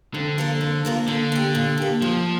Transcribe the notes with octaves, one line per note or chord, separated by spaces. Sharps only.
F2 D3
F3 A#3 F4 A#4
F2
F3 A#3 F4 A#4
A#2 D3
A#3 G4
A#2
A#3 G4
A#2 F3